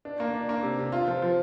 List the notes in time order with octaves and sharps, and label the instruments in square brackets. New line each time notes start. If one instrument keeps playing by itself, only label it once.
[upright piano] D4
A#3
D4
A#3
C3
C3
F4
F3
F3